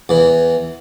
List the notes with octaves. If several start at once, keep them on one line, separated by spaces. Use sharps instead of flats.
E2 E3